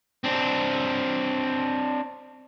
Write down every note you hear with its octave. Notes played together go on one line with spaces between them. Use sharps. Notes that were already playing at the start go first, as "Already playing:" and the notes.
C4 D4